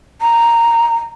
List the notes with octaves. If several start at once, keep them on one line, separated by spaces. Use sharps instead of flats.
A#5